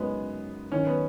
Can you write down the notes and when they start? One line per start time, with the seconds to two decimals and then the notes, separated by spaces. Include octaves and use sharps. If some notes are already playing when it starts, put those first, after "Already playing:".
Already playing: F#2 C#3 F#3 G#3 B3 D#4 F#4
0.72 D#3 F#3 C#4 D#4
0.87 B3